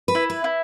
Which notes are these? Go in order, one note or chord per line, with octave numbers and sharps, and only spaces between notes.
B4
E4
B4
E4